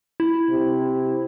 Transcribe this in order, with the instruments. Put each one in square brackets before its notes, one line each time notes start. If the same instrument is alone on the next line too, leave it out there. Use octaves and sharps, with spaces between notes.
[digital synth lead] E4
[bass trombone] C3